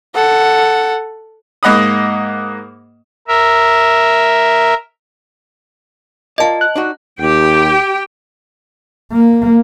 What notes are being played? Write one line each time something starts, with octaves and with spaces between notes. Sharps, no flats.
A4 F#5
G#2 A#3 D#5 F#5 B5 D#6
A#4 E5
F4 A#4 D5 D#5 A5
F#6
D4 D#4 F#4
D#2 G4 G5
A#3